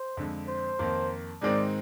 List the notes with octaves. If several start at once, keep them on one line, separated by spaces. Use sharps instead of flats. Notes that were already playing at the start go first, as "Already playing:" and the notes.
Already playing: C5
F2 D3 G#3
C5
F2 D#3 A#3
G#2 D#3 G#3 C4 D#4 D5